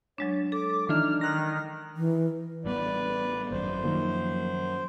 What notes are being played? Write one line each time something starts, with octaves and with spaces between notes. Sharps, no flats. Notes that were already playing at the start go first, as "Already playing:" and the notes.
F#3 G#3 D4 C#5
A4 D6
D#3 E3 D4 D#4 F6
D#3 F6 F#6 A#6
E3
A1 G3 B3 B4 D5
G#1 F#2 C5
F#2 D#3 F3 A#3